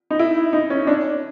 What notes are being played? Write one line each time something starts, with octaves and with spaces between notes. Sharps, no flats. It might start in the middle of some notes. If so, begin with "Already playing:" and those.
D#4
E4
D#4
C#4
D4